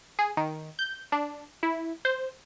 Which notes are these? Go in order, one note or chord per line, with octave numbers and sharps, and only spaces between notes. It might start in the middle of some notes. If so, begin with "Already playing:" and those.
G#4
D#3
G6
D4
E4
C5